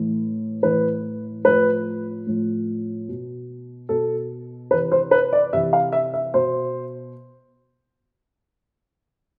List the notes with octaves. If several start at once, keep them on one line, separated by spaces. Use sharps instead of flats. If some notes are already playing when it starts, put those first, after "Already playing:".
Already playing: A2 E3
A2 E3 B4
A2 F3 B4
A2 F3
B2
B2 A4
C3 E3 B4
C5
B4
D5
C3 E3 E5
F5
E5
E5
B2 C5